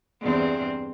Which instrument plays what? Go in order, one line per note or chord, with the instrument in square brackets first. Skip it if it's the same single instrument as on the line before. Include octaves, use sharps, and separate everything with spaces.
[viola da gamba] E2 G2 C4